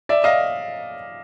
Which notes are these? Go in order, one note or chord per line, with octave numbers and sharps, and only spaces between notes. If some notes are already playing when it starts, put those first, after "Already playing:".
D5 E5
D#5 F5